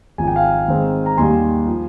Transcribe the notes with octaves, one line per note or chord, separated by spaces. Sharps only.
G#1 G#2 F3 G#5
G5
F5 G#5
G#2 D#3 G#3 C4
A#5
D#2 D#3 G3 G#5 C6
F3